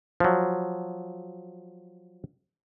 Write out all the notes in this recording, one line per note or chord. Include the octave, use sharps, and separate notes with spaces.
F3 F#3